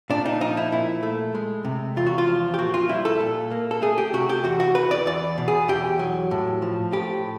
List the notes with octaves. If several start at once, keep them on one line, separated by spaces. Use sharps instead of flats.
A#2 D4
D#4
F3 D#4
E4
A#2 E4
A3
G#3
C3
E2 F4
F#4
F4
F3
G4
A#2 F#4
F4
G3 E4
A4
A#2
A#3
A4
A3 G#4
G4
C3 F#4
G4
E2 F#4
F#4
E3 B4
D5
E2 D5
B2
G#4
E2 G4
F#3
A2
F3
A2 G4